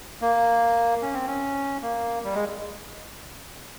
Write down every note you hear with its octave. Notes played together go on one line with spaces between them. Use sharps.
A#3
C#4
C4
C#4
A#3
G3
G#3